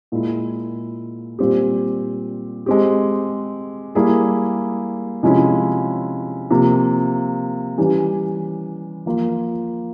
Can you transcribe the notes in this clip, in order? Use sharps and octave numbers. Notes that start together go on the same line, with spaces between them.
A#2 G#3 E4
A#2 G3 C4 G4
G#3 C4 G4
G3 A#3 E4 G#4
C3 F3 G#3 C#4 E4
C3 F3 A#3
E3 G3 C#4 E4 G4
F3 A#3 F4